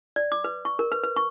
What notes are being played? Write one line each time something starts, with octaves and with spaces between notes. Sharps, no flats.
D5
D6
B4
C#6
A#4
B4
B4
C#6